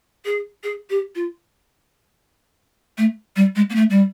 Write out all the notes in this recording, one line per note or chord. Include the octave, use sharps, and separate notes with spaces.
G#4
G#4
G4
F4
A3
G3
G#3
A#3
A3
G3